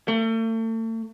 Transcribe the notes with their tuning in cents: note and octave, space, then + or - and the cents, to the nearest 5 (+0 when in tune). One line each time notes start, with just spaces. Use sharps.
A3 +40